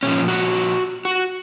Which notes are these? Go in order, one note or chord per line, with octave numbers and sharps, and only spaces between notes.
A#2 F3 C#4
F#4
F#4